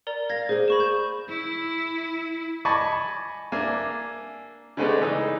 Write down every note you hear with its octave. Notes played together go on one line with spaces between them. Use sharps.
A#4 D5 A#5
F5 G#6 A#6
A#3 G#4 C5
B5 C#6 E7
G6 E7
E4
D#5 G#5 A5 B5 C#6 D6
A#3 D4 E5 G#5
C#3 G#3 A3 B3 C#4 D4
E3 D#4